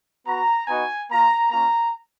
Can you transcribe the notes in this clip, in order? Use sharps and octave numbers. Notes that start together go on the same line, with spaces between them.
B3 F#4 A#5
B3 D#4 F#4 G#5
A#3 F4 A#5
A#3 C#4 F4 A#5